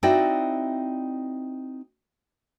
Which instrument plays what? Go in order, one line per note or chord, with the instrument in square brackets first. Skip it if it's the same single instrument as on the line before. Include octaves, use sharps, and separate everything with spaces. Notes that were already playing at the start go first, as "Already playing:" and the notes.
[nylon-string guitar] C4 D#4 E4 F#4 D5 G5